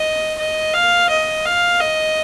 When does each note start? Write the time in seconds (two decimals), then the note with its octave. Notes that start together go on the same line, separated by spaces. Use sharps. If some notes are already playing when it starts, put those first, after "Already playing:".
Already playing: D#5
0.39 D#5
0.74 F5
1.09 D#5
1.45 F5
1.80 D#5